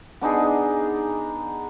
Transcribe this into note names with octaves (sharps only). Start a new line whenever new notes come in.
B3 D4 D#4 G#4